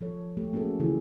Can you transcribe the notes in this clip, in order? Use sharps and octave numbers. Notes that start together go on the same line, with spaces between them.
F3 A4 C#5
F#3 A3 G4
A#3 C#4 F#4 G#4 A4
C#3 E3 E4 F4 G#4